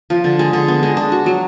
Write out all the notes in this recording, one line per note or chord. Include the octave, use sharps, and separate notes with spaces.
F3
D3
G#3
D3
B3
G#3
D4
F#4
F#3